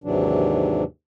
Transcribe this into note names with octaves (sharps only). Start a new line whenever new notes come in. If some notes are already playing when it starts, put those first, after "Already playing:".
D#2 G#2 C3 E3 F#3 D4